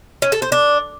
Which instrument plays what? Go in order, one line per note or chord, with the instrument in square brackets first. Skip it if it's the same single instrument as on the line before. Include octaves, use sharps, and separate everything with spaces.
[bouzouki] C#4
A4
C5
D4